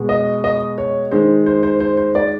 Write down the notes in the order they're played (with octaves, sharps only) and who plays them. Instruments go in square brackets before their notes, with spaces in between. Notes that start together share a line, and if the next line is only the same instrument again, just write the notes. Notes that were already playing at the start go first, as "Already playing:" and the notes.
Already playing: [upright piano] B2 G#3
D#5
D#5
C#5
D#3 G#3 C5
C5
C5
C5
C5
D5